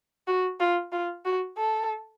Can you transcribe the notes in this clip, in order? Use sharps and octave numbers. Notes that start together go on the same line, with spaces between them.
F#4
F4
F4
F#4
A4